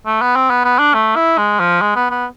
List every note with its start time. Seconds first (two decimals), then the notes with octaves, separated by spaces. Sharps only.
0.06 A3
0.22 B3
0.36 C4
0.50 B3
0.65 B3
0.79 D4
0.94 A3
1.16 E4
1.38 G#3
1.60 F3
1.81 G#3
1.96 B3
2.11 B3